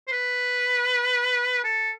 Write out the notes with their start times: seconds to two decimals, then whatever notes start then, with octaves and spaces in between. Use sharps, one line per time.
0.08 C5
0.12 B4
1.64 A4